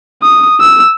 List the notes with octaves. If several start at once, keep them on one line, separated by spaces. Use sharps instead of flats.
D#6
E6